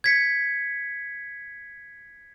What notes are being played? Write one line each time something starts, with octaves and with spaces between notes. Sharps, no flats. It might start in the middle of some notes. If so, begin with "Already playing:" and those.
G#6 B6 C#7